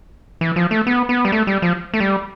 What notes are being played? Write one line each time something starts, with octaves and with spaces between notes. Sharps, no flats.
E3
F3
A3
B3
B3
G3
A3
G3
F3
A3
G3